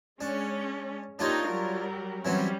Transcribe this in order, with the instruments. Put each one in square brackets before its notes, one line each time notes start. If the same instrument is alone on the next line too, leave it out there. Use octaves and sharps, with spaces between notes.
[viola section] G#3 C#4 [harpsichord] D4
[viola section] A#3 D#4 G4 [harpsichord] D4 F4 C#5
[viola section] F#3 G3 A#4
[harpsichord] E3 F#3 C4 [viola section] G3 C#4